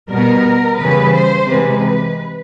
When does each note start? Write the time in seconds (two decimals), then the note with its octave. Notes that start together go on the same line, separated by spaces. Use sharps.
0.12 B2 G3 B3 A#4
0.80 C#3 E3 G3 B4
1.15 C5
1.49 C3 E3 G#3 B4